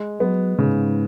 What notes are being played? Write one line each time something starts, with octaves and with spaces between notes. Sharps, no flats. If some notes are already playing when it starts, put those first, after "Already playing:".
Already playing: G#3
F#3 B3
G#2 C#3